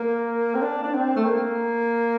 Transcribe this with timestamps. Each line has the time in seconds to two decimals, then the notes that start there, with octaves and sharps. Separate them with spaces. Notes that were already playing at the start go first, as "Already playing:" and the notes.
Already playing: A#3
0.55 C4
0.62 D4
0.84 D4
0.94 C4
1.16 A3
1.25 A#3